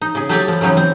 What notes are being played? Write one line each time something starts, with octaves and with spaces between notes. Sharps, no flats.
D#4
C#3 G#4
F#3 A3 G4 G#4 C#5 D5
F3 G3
C#3 E3 F#3 C#4 D#4
C4